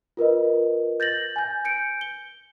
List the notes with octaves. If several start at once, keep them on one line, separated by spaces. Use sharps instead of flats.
F4 A#4 B4 D#5
G6 A6 A#6 F#7
G#5 G6
G6 C#7 D7
G7